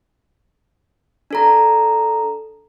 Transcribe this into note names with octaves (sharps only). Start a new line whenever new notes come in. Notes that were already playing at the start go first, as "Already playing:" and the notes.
D4 A4 A#5